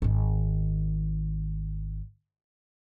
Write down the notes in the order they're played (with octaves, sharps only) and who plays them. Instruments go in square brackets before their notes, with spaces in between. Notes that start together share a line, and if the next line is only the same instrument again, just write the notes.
[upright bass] G#1 D#3